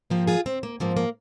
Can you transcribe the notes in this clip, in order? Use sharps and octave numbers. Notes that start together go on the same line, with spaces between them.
G#2 F3 A#3 G4 A#4
F4 G#4
C4
A#3
G#2 F3 A#3 C4
A#3